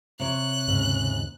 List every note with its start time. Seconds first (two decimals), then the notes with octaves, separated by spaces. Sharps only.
0.20 C3 C#5 F#6
0.68 D#2 G#2 C#3